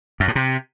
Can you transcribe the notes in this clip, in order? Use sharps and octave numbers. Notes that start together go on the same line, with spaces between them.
F#2
A2
C3